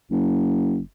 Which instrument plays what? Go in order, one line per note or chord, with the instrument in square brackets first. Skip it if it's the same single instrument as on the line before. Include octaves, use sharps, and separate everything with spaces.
[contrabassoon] F#1